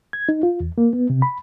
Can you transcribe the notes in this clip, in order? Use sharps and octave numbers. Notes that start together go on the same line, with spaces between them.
G#6
D#4
F4
E2
A#3
B3
C3
B5